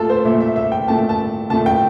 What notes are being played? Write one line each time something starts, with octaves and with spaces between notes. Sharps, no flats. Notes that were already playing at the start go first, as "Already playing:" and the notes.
Already playing: A#2 A3 F4 A4
C5
A#2 A3 E5
E5
E5
G5
A#2 A3 A5
A5
A#2 A3 A5
G5